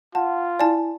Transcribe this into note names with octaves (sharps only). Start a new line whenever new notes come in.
F4 F#5 A5
E4 D5 G#5 A5